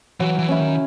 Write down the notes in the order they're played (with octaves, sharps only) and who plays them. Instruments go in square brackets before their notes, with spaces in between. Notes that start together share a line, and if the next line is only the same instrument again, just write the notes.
[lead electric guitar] E3 [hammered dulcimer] F#3
[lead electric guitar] E3
[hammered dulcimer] C#4 E4
[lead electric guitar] D#3